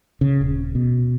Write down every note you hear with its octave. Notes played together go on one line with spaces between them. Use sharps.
C#3
D#1
B2